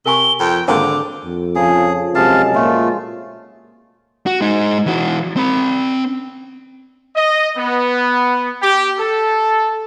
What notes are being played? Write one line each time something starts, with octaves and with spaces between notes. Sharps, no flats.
C3 A#4 G#5 C#6 G7
F2 G5
G#1 D3 A#3 C4 D6
F2
C#3 F3 G#4
F#2 C3 G#3 F5 A5
A#2 A3 F4
F#4
G#3 D#4
E3 F#4
C4 B5
D#5
B3
G4
A4